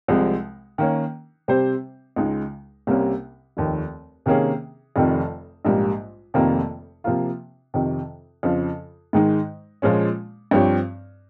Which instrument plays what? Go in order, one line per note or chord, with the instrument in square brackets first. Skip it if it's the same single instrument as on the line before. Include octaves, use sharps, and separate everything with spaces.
[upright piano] C2 C3 F3 G#3
D#3 A#3 C#4
C3 G3 C4 G4 C5
C#2 C#3 G#3 D#4
C2 C3 G3 A#3 C#4
F1 D#2 D#3
C3 D#3 A#3 C#4 G#4
F1 F2 C3 D#3
A#1 G#2 G3 A#3
F1 F2 C3 D#3 A#3
C3 F3 A#3 F4
F2 C3 D#3
F2 C#3 F3
G#2 D#3 G#3 D#4
A#2 F3 G#3 C#4
G2 F3 C4 G4 C#5